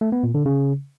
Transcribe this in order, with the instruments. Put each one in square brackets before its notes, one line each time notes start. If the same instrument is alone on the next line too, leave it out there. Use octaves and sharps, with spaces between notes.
[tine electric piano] A3
B3
A#2
D3
C#3